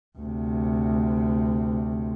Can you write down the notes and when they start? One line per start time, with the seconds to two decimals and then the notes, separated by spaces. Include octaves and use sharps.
0.19 D2 C3